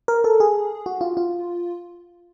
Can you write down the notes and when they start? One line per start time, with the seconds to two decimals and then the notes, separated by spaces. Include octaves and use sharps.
0.08 A#4
0.24 A4
0.40 G#4
0.86 F#4
1.01 F4
1.17 F4